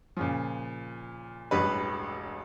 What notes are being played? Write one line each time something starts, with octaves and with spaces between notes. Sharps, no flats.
A#2 C#3 F3
E1 A1 G2 B4